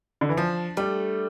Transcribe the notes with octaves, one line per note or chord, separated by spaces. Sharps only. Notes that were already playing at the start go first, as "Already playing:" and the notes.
D3
E3
F3 D4
G3 A3